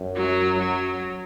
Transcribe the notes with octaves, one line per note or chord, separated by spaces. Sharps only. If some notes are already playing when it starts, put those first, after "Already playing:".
Already playing: F#2
F#3
F#3